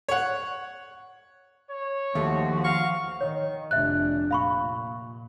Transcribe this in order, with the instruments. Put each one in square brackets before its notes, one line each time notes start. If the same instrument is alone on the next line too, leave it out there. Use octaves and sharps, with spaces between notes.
[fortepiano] C#5 F#5
[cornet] C#5
[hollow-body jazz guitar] D#2 [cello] F3 F#4 [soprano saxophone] A3
[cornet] F5 [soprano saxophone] C#6
[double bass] D#3 [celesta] C#5
[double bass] F1 D4 [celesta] E5 F#6
[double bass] A#2 [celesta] F5 B5 C#6